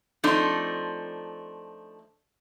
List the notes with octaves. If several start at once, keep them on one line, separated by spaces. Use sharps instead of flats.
F3 A3 C4 D4 D#4